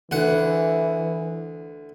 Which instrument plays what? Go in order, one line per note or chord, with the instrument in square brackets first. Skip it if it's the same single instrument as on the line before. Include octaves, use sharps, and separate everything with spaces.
[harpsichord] D2 F#5 [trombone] E3